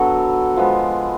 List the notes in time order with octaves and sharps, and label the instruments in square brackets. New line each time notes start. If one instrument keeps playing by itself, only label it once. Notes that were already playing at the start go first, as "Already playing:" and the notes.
Already playing: [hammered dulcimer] D3 F#3 B3 F#4 A4
F3 G#3 B3